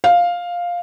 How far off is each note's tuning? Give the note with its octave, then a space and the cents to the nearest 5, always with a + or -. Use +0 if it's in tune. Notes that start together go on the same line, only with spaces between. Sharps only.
F5 +5